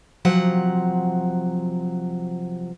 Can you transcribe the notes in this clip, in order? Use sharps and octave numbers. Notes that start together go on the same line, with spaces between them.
C3 F3 F#3 F#5